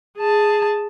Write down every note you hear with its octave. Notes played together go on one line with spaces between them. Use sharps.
G#4 A5